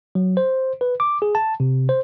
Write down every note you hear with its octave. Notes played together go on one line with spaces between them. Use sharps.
F#3
C5
B4
D6
G#4
A5
C3
C5